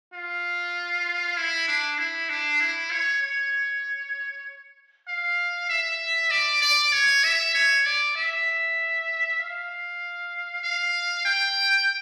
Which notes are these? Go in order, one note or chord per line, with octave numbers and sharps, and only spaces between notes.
F4
E4
D4
E4
D4
E4
C#5
C#5
F5
E5
D5
D5
C#5
E5
C#5
D5
E5
F5
F5
G5